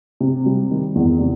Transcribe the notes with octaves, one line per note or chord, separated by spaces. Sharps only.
C3
G3
D#3
E2
C3